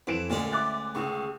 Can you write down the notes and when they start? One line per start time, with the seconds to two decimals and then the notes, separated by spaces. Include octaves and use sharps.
0.07 F2 E3 D7 E7
0.30 D2 A#2 G#3 C#4 A4
0.52 E5 D6 F#6 A6
0.95 C#2 G#4 C#6